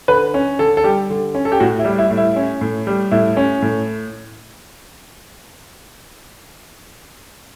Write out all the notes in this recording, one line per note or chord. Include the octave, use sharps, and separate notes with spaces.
D3 B4
C#4
D3 A4
A4
G3 G4
D3
C#4
A4
G4
A2 F#4
E4
G3
E4
A2
E4
C#4
A2
G3
A2 E4
C#4
A2